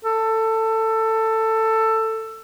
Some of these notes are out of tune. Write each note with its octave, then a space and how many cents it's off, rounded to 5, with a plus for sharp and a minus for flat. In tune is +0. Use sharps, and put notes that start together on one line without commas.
A4 +15